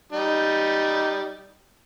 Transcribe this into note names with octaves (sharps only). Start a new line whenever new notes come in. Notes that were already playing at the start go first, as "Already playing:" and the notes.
G3 D#4